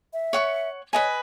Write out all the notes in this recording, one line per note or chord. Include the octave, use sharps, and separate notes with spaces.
E5
C#5 F#5 C#6
B4 C#5 D#5 G#5